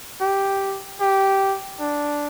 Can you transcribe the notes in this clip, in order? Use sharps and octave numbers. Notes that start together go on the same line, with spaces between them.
G4
G4
D4